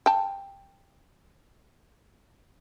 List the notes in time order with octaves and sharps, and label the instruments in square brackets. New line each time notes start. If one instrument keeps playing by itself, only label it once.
[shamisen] G5 A5